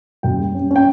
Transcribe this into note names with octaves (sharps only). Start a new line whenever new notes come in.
F#2 G5
G3
C#4
C#4
G5